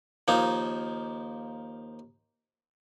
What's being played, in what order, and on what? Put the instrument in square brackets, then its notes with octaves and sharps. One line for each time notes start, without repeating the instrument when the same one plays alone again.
[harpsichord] D#2 F3 A#3 D#4